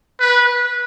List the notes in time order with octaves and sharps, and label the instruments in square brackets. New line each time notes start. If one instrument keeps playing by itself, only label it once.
[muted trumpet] B4